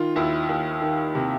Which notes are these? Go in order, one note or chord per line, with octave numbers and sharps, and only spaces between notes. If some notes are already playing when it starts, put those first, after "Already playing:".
Already playing: D#3 F4
D#2 E4
D#2
D#3
C3